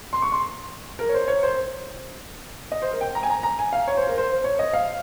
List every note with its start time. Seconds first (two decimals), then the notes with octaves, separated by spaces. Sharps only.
0.13 C6
0.22 C#6
0.32 C6
0.99 A#4
1.09 C#5
1.14 C5
1.28 C#5
1.43 C5
2.72 D#5
2.82 C5
2.91 A#4
3.01 G5
3.15 A#5
3.23 G#5
3.30 A#5
3.43 A#5
3.59 G#5
3.73 F5
3.87 C#5
3.97 C5
4.07 A#4
4.18 C5
4.44 C#5
4.59 D#5
4.73 F5